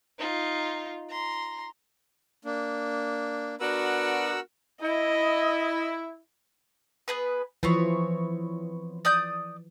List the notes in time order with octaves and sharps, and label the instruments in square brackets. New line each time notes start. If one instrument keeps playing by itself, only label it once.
[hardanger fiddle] D#4 F4
A#5 C6
[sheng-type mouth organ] A#3 D4
[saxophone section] B3 D4 F#4 [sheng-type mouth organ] A#4 F#5 E6
[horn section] E4 [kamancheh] D#5
[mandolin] B3 G#4 B4
[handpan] E3 F3 [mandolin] B3 C4 C#5
[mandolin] D5 D#6 G6